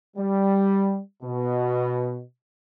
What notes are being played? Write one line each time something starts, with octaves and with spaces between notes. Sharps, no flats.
G3
B2